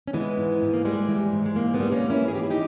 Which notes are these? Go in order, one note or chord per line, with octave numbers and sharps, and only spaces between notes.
C#4
E3 G#3 B3
G#2
G#2
A#3
G3 G#3
E3
G#2
G#3
G#2 A#3
G#3 B3
G3
A#3 C#4
E3
C#4 E4
G#2 G#4
G4
E4
D#4 G4